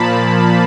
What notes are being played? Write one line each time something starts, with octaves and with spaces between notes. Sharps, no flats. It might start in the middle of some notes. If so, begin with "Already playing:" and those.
Already playing: A#2 F3 A#3 A5 B5